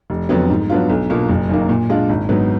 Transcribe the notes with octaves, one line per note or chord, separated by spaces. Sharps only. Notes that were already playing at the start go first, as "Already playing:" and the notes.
F1
F2 D3 F#3 B3
G#2
F#3 B3 D4 F4
B1
B2 A#3 F4
F#1
F#2 D#3 A#3
A#2
G#3 D4 F4
G#1
G#2 F#3 B3